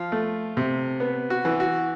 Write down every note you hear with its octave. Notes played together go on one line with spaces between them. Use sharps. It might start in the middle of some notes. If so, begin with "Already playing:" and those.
Already playing: F3 F4
A3
C3
B3
F#4
E3
F#4